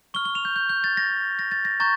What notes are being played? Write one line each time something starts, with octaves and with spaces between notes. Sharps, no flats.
C#6 F6 G7
G7
F7
G6
G6
G6
A6
A#6
A#6
A6
A#6
A#5 C#6 G6 A6